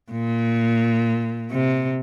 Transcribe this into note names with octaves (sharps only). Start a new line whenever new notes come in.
A#2
C3